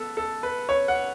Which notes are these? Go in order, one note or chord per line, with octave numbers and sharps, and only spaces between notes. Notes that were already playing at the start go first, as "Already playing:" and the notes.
Already playing: B3 A4
A4
B4
C#5
F#5